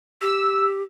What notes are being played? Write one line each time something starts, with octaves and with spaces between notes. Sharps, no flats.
G4 E6